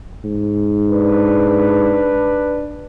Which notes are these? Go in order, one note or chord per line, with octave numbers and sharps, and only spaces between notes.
G#2
D4 B4